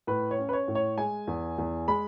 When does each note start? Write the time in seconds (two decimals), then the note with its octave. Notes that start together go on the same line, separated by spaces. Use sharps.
0.07 A2 B4
0.31 C#5
0.39 C#4
0.49 B4
0.53 C#5
0.68 A2
0.75 C#5
0.98 G#3 G#5
1.27 E2
1.58 E2
1.88 G#3 B5